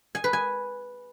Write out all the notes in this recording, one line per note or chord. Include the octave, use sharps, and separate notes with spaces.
G#5
B4
G#5